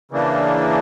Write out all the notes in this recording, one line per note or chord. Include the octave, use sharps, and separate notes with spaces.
C#3 E3 A#3 D4